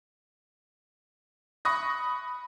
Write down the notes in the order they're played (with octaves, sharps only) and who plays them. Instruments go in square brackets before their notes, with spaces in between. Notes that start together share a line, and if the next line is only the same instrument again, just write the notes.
[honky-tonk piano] B5 C#6 D#6 F#6 A#6